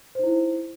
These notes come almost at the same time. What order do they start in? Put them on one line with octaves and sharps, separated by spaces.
C5 D#4 E4